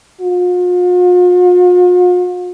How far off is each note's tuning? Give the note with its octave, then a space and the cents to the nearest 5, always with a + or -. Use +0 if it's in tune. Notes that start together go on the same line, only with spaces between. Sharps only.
F4 +45